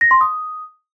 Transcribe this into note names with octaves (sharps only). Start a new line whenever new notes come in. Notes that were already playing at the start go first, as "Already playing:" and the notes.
A#6
C6
D#6